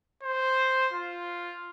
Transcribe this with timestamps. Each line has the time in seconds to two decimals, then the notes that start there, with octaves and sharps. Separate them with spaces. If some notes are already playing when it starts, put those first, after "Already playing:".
0.23 C5
0.93 F4